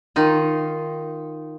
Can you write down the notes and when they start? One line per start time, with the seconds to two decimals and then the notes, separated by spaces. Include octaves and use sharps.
0.16 D#3 D#4 F4